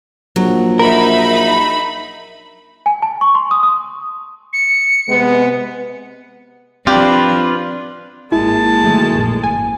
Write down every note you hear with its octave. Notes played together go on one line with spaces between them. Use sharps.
A#1 F#3
D#4 A#4 E5 B5
G#5
A5
C#6
C6
D#6
D#6
C#7
C3 G#3 B3
F3 C4 D4 F4 G4 B4
G#1 G#3 A#3 E4 A5
D#3 F#3 A3
A#1 F#2
G#1 G#5